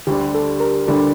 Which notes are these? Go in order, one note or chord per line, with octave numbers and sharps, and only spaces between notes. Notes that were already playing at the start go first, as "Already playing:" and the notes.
D2 D3 G3 D4 G4
A4
A#4
D2 D3 G3 D4